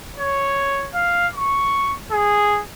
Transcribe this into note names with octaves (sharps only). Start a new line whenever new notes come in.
C#5
F5
C#6
G#4